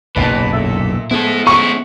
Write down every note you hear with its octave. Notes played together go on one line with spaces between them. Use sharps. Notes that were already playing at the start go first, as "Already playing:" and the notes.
F#1 B1 E2 A#2 B4 A5
A4 E5
F3 G#3 A3 B3 E4 A4
C#4 E4 C#6